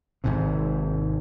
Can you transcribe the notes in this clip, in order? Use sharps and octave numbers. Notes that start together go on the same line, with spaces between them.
G#1 G#2 C3